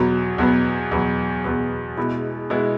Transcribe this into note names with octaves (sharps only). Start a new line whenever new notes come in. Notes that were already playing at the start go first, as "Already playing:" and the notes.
Already playing: E2 B2 F#3 B3
E2 B2 F#3 B3
E2 B2 F#3 B3
E2 B2 F#3 B3
B2 G#3 B3 E4
B2 G#3 B3 E4